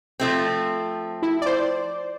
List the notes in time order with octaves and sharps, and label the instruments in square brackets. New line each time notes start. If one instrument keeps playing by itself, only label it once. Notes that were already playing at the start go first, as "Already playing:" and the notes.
[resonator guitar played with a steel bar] F3 A3 C4
[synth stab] E4
C5 D5